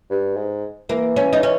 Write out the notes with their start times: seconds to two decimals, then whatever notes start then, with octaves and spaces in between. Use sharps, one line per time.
0.11 G2
0.36 G#2
0.89 E3 A#3
1.16 C#4
1.33 D#4
1.43 C#4